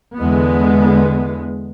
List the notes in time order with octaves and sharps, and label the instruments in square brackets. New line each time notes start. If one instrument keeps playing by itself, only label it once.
[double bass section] E2 D3 G#3 B3